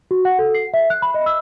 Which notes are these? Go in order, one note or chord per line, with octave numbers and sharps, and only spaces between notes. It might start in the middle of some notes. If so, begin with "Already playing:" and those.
F#4
F#5
A4
C7
E5
F#6
B5
D#5
E6